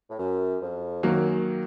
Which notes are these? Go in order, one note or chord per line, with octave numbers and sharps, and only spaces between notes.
A2
F#2
F2
F#2 D#3 F#3 A#3